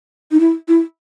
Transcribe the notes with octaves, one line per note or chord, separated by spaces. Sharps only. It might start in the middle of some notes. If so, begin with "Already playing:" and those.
D#4
E4
E4